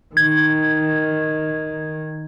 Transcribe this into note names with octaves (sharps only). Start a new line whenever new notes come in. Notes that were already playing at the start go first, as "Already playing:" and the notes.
D#3 G#6